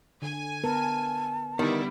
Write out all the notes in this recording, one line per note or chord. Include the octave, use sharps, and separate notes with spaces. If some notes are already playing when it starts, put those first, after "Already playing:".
D3 G#5
B3 A#4 B4 A5
D3 D#3 G3 B3 E4